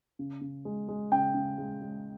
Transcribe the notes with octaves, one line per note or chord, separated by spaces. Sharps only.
C#3
C#3
G#3
G#3
C#3 G5
C#3
G#3
G#3